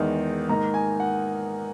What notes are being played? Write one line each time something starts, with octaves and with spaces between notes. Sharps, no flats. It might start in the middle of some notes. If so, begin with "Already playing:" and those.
Already playing: E2 D#3 G#3 D#4
G#2 D#3 A#3 D#4 A#5
G#5
F#5